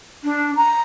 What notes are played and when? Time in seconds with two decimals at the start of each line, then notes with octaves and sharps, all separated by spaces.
0.24 D4
0.56 A#5